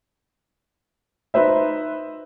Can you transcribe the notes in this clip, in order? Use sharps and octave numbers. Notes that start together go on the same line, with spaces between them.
D#4 B4 C5 E5